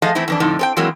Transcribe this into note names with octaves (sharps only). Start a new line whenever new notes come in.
F3 A3 G#4 D#5 F5
E3 A3 C4 E4
F2 E3 D4
F2 A2 D3 D#4
C4 A4 G5
E3 F#3 G#3 A#3 C4 E4